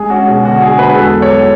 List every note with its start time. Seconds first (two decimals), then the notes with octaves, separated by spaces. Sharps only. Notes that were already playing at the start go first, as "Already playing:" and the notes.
Already playing: G#3 G#4
0.10 C#4 F#4
0.28 B2 G#4
0.45 D3 F#4
0.62 D3 G#4
0.79 G#3 B4
0.89 G#4
0.96 E2 A4
1.13 E2
1.22 C#5
1.30 F#3